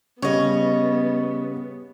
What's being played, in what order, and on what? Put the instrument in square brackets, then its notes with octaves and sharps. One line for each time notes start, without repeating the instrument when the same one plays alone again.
[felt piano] C#3 G3 [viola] B3 [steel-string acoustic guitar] C#5 D#5